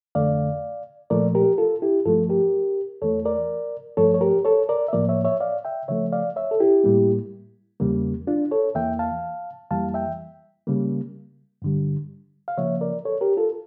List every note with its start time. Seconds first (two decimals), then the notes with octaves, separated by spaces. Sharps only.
0.15 F2 D3 A3 D5 F5
1.10 A#2 F3 A3 A#4 D5
1.35 G4 A#4
1.58 F4 A4
1.82 E4 G4
2.06 G2 F3 A3 F4 A4
2.30 G4 A#4
3.02 E2 E3 A3 A4 C#5
3.25 A#4 D5
3.97 G2 F3 A3 A4 C#5
4.14 C#5
4.21 G4 A#4
4.45 A4 C#5
4.69 A#4 D5
4.88 E5
4.93 A2 F3 A#3 A#4 D5
5.09 C#5 E5
5.25 C#5 E5
5.40 D5 F5
5.65 E5 G5
5.88 C#3 F3 A3 C#5 E5
6.12 D5 F5
6.36 C#5 E5
6.51 A4
6.60 E4 G4
6.84 A2 G3 A#3
7.80 E2 C#3 G3 A#3
8.27 D4 F4
8.51 A4 C#5
8.75 E2 E3 A#3 E5 G5
8.99 F5 A5
9.71 F2 E3 G3 A#3 F5 A5
9.94 E5 G5
10.67 C#3 G3 A#3
11.62 G2 D3 G3
12.48 F5
12.57 C#3 F3 A#3 C#5 E5
12.81 A#4 D5
13.05 A4 C#5
13.21 G4 A#4
13.37 F4 A4